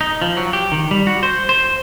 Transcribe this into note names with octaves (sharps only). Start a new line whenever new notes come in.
D#4
F3
F#3
G4
D#3
G3
F#4
C5
C5